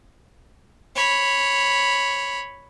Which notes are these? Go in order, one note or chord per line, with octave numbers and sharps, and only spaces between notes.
C#5 B5